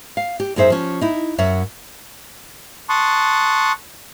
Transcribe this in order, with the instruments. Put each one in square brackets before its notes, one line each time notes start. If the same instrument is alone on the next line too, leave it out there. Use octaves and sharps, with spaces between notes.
[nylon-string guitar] F5
G4
F#2 D#4 G#4 C5 E5
F3 C#4
D#4 E4
F#2 C#5 E5 F#5
[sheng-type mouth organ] A5 C6 C#6 D#6 F#6